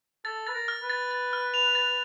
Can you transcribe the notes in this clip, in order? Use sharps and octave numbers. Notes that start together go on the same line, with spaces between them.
A4 A6
B4 A6
A#4
F6
B4
A6
A6
F6
F7
A6